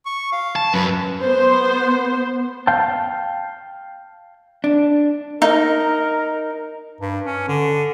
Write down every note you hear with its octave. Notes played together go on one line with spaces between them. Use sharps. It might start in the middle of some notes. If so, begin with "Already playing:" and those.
C#6
F5
A5
F#2 B4
B3 C5
F5 G5 A5
D4
D#4 A#4
G2
C#4
D3